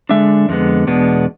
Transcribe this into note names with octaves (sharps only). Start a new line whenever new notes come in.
D3 G#3 D4 E5
F2 D3 G#3 B3
E2 B2 G#3 B3 D4